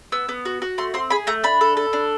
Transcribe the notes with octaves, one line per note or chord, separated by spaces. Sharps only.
B3 E6
B3
F#4
F#4
A3 C6
C4 C6
G#4 B5
A3 A#5
D4 B5
A4
A4
D4